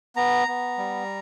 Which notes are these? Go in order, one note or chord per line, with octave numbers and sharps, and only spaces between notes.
B3 A#5
B3
G3